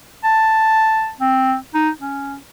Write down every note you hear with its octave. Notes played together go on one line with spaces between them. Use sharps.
A5
C4
D#4
C#4